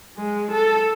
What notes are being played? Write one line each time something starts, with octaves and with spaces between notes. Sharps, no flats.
G#3
A4